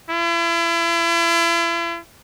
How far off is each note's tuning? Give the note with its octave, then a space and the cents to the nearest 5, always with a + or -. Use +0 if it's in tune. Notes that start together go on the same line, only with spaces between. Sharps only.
E4 +40